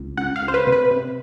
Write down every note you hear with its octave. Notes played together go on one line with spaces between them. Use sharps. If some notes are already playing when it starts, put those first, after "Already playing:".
Already playing: C#2
C#2 F#5
F5
C#2
C5
B4
C3
B4
C3